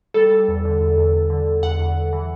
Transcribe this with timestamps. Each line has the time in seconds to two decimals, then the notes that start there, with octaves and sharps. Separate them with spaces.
0.14 G3 A4
0.31 G3
0.48 E2
0.65 D3
0.81 E2
0.97 E2
1.13 E2
1.30 D3
1.47 D3
1.62 E2 F#5
1.79 E2
1.95 E2
2.12 E3